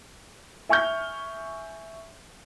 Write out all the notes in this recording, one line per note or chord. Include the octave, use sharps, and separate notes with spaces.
E5 G#5 C#6 F6 G6